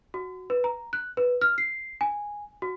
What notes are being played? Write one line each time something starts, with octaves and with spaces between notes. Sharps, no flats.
F#4
B4
A#5
F#6
B4
F6
C7
G#5
F#4